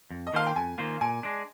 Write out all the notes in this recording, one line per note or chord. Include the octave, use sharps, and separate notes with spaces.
F2
D#5
D#3 A#3 F4 C5 F5
G5
F2 G#5
D#3 A#3 F4 C5
A#2 G#5
G#3 D4